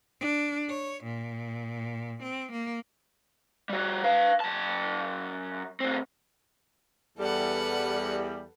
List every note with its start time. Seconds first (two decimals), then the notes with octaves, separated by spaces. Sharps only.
0.20 D4
0.69 C#5
1.04 A#2
2.23 C4
2.52 A#3
3.69 G3 F#4
4.04 B4 F5
4.40 F#2 A5
5.80 A2 C4
7.18 E2 G3 A4 B4 F#5